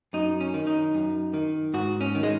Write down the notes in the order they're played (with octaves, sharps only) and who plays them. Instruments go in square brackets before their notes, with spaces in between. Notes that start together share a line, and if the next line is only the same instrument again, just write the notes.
[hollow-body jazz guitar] F#2 D#4
C#4
D#3
D#4
F#2
D#3
G#2 F#4
C#4
D#3
G#3